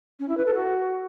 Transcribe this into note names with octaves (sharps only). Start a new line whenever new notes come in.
C#4
E4
B4
A4
F#4